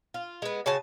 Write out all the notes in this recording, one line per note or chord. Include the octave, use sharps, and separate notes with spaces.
F4
G#3 B3
C#3 F#4 G#5 A5